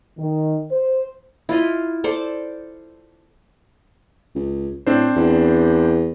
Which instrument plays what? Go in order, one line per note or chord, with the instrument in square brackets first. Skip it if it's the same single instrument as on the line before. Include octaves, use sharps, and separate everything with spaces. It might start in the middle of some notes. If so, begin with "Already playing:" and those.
[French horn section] D#3
C5
[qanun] E4 F4 D#5
A4 C5 D5
[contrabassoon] C#2
[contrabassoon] A2 [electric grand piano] C4 D4 C5
[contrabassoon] E2